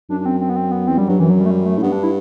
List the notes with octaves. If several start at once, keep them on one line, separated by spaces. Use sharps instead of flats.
F#2 D4
D4
C4
C4
B3
C4
B3
E2 C4
F#2 G3
G2 F#3
F#2 E3
F#3
G3
A3
G3
A3
A2
G2 B3
D4
E4